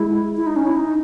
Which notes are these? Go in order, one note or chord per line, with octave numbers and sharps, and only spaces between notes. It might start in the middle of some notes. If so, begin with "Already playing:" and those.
Already playing: G#3 E4
E4
D#4
C#4
E4
D#4